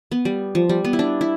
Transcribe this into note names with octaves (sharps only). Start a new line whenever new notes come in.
B3
G3
F3
G3
B3
E4
D4
E4